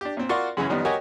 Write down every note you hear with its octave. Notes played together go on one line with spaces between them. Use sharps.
D4 G4
A#2 C4
F4 F#4 A#4 D5 C6 C#6
F#2 C#3 E3 C#4
F2 D#3 G3 B3
F#4 G4 A#4 C#5 D#5 G#5